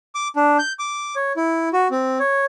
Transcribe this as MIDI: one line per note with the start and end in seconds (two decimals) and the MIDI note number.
0.15 0.28 86
0.36 0.58 62
0.59 0.73 91
0.79 1.15 86
1.16 1.32 73
1.37 1.69 64
1.73 1.88 66
1.91 2.18 60
2.20 2.45 73